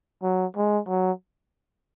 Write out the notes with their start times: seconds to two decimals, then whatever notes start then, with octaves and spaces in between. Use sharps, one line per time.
0.23 F#3
0.56 G#3
0.88 F#3